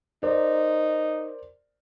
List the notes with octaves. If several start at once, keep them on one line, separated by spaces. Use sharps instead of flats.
D#4 A#4 C5 D5